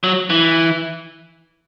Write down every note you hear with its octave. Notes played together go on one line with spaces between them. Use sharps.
F#3
E3